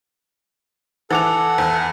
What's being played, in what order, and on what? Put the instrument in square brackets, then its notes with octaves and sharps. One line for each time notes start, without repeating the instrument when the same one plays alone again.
[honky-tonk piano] E3 D6 F7 [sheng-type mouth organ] A4 F#5
[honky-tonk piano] E2